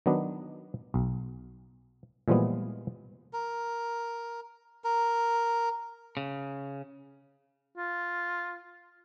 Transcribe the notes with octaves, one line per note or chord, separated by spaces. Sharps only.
D#3 F#3 B3 D4
B1
A#2 E3 F3 G3 G#3 B3
A#4
A#4
C#3
F4